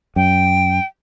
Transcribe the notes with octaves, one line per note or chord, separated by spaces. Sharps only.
F#2 G5